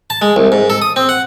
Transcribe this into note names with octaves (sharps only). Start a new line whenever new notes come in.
A5
G#3
C2
G#2
A4
D#6
C4
F#5